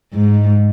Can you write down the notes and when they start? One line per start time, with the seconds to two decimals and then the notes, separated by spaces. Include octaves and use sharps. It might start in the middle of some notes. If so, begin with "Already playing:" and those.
0.13 G#2